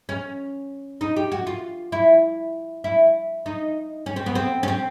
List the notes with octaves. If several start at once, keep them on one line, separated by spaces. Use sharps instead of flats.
C#4
D#4
G4
F#4
F4
E4
E4
D#4
C#4
C4
B3
C4
C#4
C4